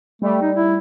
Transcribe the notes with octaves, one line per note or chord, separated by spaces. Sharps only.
G3 A3
D#4
E4